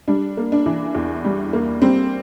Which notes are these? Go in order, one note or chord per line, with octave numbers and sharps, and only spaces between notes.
G3 D4
A#3
D4
E3
E2
G3
A#3
G3 C4